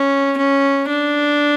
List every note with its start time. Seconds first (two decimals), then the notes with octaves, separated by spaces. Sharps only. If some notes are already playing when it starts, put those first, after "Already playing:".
Already playing: C#4
0.37 C#4
0.88 D4